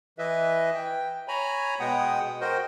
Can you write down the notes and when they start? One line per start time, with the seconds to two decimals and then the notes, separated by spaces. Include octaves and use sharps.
0.19 E3 E4 B4 D#5 E5
0.75 G5
1.28 C#5 G#5 A#5 B5
1.80 B2 G#3 B3 F#5 G5 D#6
2.41 F#4 A#4 C5 D#5 G5